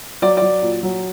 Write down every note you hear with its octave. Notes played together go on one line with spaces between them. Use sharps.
F#3 D5
D5
F#3
A#2
F#3